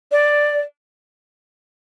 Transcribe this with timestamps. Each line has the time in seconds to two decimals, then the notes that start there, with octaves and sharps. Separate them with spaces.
0.12 D5